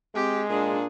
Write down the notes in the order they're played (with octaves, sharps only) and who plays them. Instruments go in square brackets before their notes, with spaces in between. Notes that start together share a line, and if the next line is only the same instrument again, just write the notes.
[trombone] G#3 [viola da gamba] C4 [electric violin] G4
[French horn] A#2 [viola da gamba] D4 [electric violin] G#4